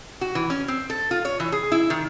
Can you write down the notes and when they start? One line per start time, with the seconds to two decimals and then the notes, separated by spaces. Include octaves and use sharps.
0.21 F#4
0.35 E3
0.50 C#4
0.68 C4
0.90 A4
1.11 F4
1.25 C#5
1.40 E3
1.52 G#4
1.72 E4
1.90 D#3